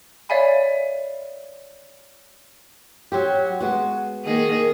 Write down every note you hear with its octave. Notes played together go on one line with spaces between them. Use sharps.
C#5 D5 E5 F5 G#5 B5
F#3 C4 G4
G#3 B3 F#4
D#3 A#3 G#4